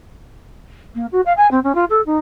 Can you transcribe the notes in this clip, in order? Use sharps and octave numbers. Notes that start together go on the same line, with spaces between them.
A#3
F#4
F5
G#5
C4
C#4
F4
A4
D#4